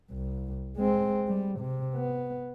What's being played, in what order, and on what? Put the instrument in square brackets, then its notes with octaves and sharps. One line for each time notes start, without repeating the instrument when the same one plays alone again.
[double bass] C2
G#3 C4
G3
C3
B3